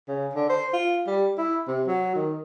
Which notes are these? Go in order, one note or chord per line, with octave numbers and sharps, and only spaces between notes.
C#3
D3
C5
F4
G3
E4
C3
F#3
D#3